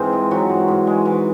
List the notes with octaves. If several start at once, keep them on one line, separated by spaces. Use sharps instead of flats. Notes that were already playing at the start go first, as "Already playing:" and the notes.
Already playing: G#2 E3 C4 G#4 C5
G#3
E3 F#3 F#4
G#2
G#2
G#3
E3